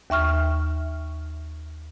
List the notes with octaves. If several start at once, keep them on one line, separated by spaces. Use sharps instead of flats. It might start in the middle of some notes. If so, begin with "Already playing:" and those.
D#2 E5 C#6 F6